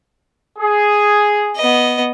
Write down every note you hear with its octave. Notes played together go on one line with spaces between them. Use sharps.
G#4
B3 D#5